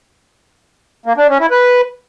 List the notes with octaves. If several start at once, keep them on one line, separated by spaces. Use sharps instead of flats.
A#3
D4
C#4
E4
B4